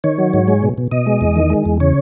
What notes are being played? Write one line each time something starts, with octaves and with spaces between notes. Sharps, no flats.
D#3 C#5
F#3
G#2
G#3
B2
B2
B2 D#5
G#3
E2
D#3
G#3
E2
C#3 C#5